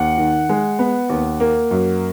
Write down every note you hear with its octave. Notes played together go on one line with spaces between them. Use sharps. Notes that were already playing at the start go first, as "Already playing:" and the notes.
Already playing: D#2 F#5
D#3
G#3
B3
D#2
A#3
F#2